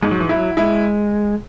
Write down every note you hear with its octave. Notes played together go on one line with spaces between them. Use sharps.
G#2 G#3
F#3
E3
F#3 E4
G#3 E4